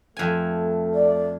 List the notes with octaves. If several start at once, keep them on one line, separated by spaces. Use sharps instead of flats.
F2 A3 G#5
D5